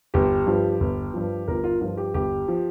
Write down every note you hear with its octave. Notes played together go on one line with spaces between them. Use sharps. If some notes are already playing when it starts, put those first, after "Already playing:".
G1 G4
G2 F3
G1
G2 F3
G1 F4 A#4
F4 A#4
G2 F3 F4
G4
G1 G4
F3